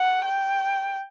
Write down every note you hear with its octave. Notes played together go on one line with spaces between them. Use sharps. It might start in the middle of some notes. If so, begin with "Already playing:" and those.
Already playing: F#5
G5